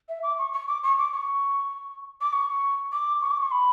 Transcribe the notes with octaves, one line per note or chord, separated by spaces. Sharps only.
E5
D6
C#6
C#6
D6
C#6
D6
C#6
D6
C#6
D6
C#6
D6
C#6
B5